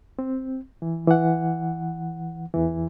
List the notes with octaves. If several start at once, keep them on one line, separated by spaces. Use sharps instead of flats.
C4
E3
E3 F#5
E2 E3